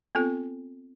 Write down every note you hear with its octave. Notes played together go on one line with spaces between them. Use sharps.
B3 C4 F4 A4